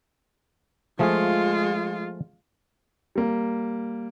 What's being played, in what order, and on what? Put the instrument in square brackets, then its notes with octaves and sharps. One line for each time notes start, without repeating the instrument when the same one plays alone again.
[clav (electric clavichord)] F3 A3 G#4 [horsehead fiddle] G#3 F4
[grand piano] G3 A#3